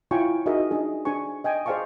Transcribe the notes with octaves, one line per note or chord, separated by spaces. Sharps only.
E4 F4 C#5 G5 G#5 C#6
D#4 F#4 G#4 A#4 D#5 E5
D4 D#4 G#4
D4 G#4 C5 G#5 C#6
D#5 G5 G#5
G#4 C5 D5 F5 A5 C#6